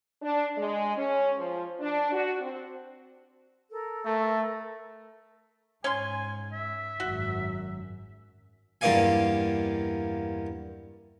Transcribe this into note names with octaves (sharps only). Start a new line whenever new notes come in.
D4
G#3
C#4
F3
D4
F#4
C4
A4 A#4
A3
G#2 C#4 G#5 C6
E5
G#1 F#2 F#4
E2 G2 A#3 D5 F5 G#5